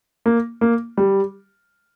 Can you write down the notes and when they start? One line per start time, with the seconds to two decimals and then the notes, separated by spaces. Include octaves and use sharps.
0.26 A#3
0.61 A#3
0.98 G3